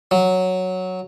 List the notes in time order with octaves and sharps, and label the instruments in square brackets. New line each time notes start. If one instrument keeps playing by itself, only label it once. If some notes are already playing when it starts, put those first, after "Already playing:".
[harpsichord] F#3